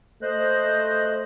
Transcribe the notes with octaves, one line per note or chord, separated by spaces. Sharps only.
A3 C5 D#5 F#6